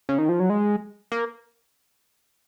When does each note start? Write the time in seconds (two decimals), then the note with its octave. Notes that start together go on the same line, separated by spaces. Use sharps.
0.09 C#3
0.18 D#3
0.29 F3
0.40 F#3
0.50 G#3
1.12 A#3